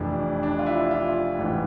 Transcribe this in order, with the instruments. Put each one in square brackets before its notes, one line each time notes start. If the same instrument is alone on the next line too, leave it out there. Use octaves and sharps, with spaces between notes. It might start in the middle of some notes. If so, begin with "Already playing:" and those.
Already playing: [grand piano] F1 F2 E3 D4
D4
F4
E4
F4
A1 G#2 E3